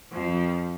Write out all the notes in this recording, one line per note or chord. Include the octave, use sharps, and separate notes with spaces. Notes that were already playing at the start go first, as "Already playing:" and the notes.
F2 F3